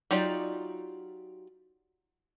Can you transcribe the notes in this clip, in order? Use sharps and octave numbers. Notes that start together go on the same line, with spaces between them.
F#3 D#4 F4 G4 D5